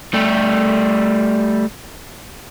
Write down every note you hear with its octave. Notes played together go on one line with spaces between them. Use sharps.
G3 A3